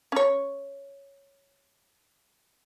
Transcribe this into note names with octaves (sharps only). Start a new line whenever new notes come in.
C#4 C#5